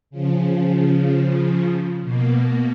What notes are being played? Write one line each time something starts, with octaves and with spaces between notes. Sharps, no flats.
C#3 F3
B2 A#3